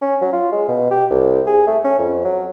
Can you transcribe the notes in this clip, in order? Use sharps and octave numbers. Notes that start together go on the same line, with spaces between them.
C#4
F#3
F4
G#3
B2
G4
C2
G#4
A3
C#4
F2
F#3